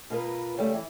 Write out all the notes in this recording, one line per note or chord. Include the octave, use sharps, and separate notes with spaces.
B2 F4 A#4 B4
C#3 G3 A3
E3